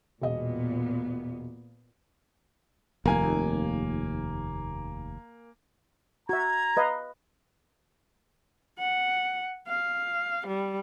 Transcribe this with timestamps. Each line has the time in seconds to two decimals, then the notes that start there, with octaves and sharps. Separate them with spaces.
0.21 E1 A#2 B3 D#5
3.05 F1 D#2 A#3 G#5
6.29 F#4 E5 A#5 G#6
6.77 B4 D#5 F5
8.79 F#5
9.68 F5
10.47 G3